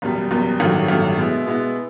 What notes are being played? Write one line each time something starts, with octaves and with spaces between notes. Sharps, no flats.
F#1 E2 B2 G3
F#1 E2 B2 G3
A1 G2 D#3 F#3 A3
A1 G2 D#3 F#3 A3
B2 G#3 B3 E4
B2 G#3 B3 E4